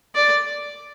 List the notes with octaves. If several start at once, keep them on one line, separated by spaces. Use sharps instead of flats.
D5